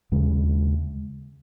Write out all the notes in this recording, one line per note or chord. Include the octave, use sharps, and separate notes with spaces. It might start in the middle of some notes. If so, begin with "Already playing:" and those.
D#2 C#3 G#3